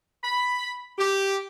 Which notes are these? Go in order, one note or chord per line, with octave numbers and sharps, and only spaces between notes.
B5
G4